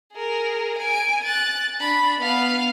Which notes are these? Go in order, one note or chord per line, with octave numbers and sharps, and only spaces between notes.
G#4 A#4
G#5 D7
F#6 A6
D4 B5
B3 F5